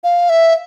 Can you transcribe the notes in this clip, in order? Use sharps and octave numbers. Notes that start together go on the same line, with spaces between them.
F5
E5